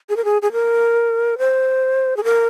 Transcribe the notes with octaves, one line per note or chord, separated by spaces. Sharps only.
G#4
A#4
G#4
G#4
A#4
C5
G#4
A#4